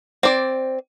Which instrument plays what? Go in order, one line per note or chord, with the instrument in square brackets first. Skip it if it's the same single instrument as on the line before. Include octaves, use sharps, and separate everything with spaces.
[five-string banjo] C4 D5